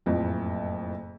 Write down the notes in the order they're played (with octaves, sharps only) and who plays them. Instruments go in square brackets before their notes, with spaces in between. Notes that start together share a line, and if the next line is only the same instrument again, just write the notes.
[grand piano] F#1 F2 A2